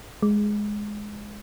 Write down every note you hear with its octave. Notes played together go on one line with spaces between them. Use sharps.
G#3